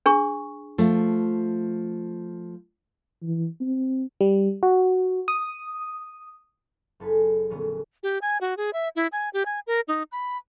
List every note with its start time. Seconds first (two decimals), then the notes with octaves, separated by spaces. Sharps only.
0.06 D4 G#4 C#6
0.78 F3 A3
3.23 E3
3.61 C4
4.21 G3
4.63 F#4
5.28 D#6
7.00 F#1 A4 B4 G#5
7.50 F1 A#2 D3 B3 C#4
8.03 G4
8.22 G#5
8.41 F#4
8.57 G#4
8.73 E5
8.96 E4
9.12 G#5
9.33 G4
9.46 G#5
9.67 A#4
9.88 D#4
10.12 B5